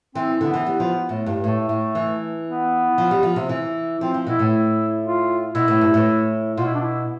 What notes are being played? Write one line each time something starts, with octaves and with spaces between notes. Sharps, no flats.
E3 C4
D3 B3
E3
G3
F3
A2
G2
A2 A3
A2
E3
B3
F3
G3
F3
C3
E3
F3 C4
F3
B2 E4
A2
E4
F4
B2 E4
A2
G2
A2
B2 F4
E4
D4
E4